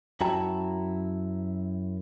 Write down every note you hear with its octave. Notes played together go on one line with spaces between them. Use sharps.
F#2 E4 F#4 G5 A5 A#5